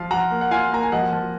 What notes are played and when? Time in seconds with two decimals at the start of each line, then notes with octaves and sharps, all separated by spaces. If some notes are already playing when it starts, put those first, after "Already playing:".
Already playing: F3 F4 F5
0.11 F3 F#5 A#5
0.31 A#3
0.41 F#5
0.51 F4 F5 G#5
0.72 A#3 A#5
0.83 G#5
0.92 F3 D#5 F#5
1.13 F3